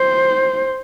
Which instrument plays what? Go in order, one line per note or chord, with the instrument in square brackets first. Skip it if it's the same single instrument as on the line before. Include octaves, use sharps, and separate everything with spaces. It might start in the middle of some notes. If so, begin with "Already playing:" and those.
Already playing: [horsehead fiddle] C5